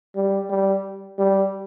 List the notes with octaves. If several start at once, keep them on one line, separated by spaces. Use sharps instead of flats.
G3
G3
G3